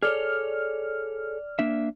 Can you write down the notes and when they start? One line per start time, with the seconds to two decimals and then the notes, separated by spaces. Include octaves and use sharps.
0.02 G#4 A4 C#5 D5 F6
1.59 A#3 D4 E5